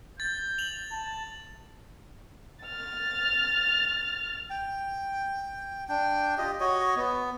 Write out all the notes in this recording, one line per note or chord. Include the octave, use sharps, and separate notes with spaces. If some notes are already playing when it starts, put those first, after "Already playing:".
G6 A6
F7 F#7
A5
F6 A6
G5
D4 G5
F4 G4 D#5 G5
F#4 C#5 D#5
B3